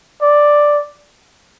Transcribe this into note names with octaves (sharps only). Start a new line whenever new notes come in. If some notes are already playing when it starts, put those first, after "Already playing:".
D5